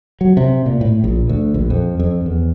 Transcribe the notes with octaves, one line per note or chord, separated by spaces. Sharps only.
F#3
C3
A#2
A2
A#1
D2
A#1
F2
F2
E2